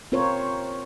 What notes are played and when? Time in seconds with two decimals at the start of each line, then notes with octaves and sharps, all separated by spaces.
0.12 C4 F4 A#4 C5 C#5